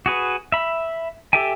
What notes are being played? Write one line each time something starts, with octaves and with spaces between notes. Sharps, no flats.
F#4 G#4 B4
E5 B5
G4 A4 E5 G5 G#5